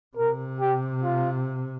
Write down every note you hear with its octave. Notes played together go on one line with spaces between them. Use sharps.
C3 A#4
G4
F4